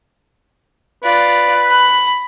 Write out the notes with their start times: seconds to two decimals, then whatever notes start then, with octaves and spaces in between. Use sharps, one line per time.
1.04 F4 B4 D5
1.70 B5